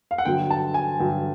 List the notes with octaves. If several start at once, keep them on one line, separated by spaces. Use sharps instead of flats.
F5
F#5
G2 D3 F#3 G5
A5
G#5
G2 D3 F#3 G5